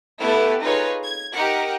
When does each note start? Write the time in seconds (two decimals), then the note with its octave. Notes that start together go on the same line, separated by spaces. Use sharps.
0.21 A3 B3 E4 G4 A4 B4
0.62 D#4 F4 G#4 B4 C#5
1.03 G#6
1.34 D#4 G4 A#4 F#5